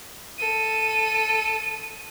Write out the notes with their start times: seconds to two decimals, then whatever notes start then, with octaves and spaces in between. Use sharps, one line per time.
0.38 A4 D#7